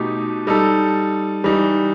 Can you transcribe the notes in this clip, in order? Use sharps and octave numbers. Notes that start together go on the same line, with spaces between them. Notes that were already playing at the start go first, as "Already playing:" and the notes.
Already playing: B2 A3 D#4 G4
G3 D#4 A4
E3 G3 D#4